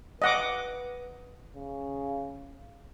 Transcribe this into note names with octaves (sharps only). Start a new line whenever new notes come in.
B4 D#5 F#5 D6
C#3